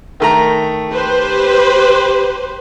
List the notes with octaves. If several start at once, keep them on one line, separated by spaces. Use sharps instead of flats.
D#3 A3 A#5
G4 B4 C5